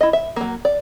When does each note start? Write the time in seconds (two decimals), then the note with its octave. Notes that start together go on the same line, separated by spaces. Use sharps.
0.01 E4 D#5
0.13 E5
0.36 F#3 A#3
0.65 D5